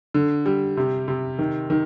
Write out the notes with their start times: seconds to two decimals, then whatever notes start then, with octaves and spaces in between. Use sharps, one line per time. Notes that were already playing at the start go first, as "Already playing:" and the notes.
0.14 D3
0.46 G3
0.77 C3
1.08 C3
1.39 D#3
1.70 D#3